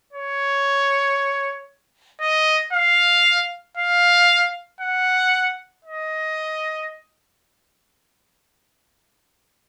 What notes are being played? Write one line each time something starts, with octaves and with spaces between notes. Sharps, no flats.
C#5
D#5
F5
F5
F#5
D#5